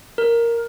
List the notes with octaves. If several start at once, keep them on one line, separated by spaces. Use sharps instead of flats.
A#4